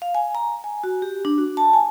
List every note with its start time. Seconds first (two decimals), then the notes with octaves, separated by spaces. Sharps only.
0.02 F5
0.15 G#5
0.35 A#5
0.64 G#5
0.84 F#4
1.02 G4
1.25 D4
1.38 F#4
1.57 A5
1.73 G#5